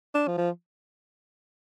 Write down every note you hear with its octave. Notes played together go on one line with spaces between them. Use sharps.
D4
F3
F3